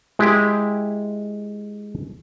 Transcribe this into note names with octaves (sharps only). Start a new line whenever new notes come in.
G#3 E4 G4